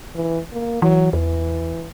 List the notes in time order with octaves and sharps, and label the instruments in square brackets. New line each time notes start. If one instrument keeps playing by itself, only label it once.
[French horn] E3
A#3
[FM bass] E3 [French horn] F#3
[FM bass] E2 [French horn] E3